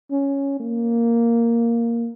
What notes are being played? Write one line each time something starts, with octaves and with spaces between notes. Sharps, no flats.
C#4
A#3